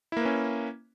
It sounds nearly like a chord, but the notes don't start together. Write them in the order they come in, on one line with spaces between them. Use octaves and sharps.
E4 A#3 B4 C#4